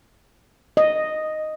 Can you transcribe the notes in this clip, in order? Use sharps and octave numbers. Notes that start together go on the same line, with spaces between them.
D#5